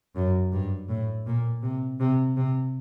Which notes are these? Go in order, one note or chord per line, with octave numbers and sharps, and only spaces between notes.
F#2
G2
A2
A#2
C3
C3
C3